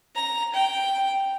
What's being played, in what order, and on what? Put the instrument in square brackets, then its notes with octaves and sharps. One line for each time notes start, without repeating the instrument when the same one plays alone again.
[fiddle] A#5
G5